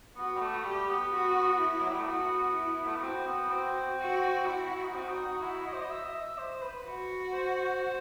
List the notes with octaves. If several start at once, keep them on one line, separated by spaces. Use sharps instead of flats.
B3 F#4
G3
A3
G3 G4
B3
F#4
E4
F#3
G3
A3
B3 F#4
E4
A3
B3
C4 F#4
B3
C4
F#4
E4 F#4
E4
D#4
C4 F#4
D#4
E4
D#5
C5
D#5
E5
D#5
E5
C5
B4
F#4
C5